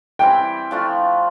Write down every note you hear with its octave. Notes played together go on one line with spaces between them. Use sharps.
E3 G3 C4 E4 G5
F3 A3 D4 F4